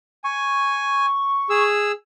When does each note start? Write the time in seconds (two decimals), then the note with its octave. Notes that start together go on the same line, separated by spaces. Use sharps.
0.24 G#5 C#6
1.50 G#4 E6